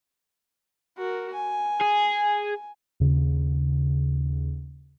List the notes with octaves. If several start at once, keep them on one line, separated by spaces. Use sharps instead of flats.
F#4 A#4
G#5
G#4
D#2 C#3